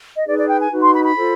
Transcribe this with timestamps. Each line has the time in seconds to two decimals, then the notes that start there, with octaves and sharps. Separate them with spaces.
0.16 D#5
0.26 D#4 G#4 B4 D5
0.38 D5
0.49 G5
0.60 G#5
0.71 D#4 F#4 B4
0.82 C6
0.93 B5
1.04 B5
1.15 F4 A4 C5